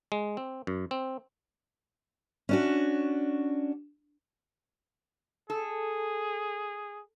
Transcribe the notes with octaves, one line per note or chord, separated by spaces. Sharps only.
G#3
C4
F#2
C4
C#4 D4 F#4
G#4 A4